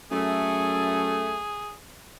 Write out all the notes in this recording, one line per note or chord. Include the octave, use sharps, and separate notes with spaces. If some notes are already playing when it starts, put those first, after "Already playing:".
F#2 A3 G#4